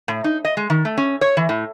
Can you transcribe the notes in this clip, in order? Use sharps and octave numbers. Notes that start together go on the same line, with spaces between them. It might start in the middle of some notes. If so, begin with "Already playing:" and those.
A2
D#4
D#5
G#3
D#3
A3
C#4
C#5
E3
A2